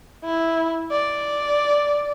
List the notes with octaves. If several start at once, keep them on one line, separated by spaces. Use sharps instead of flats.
E4
D5